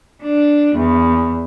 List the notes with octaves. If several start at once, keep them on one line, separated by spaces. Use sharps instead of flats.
D4
E2